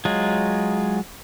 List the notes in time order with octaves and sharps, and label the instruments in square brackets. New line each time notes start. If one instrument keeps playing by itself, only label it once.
[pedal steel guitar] F#3 G#3 F4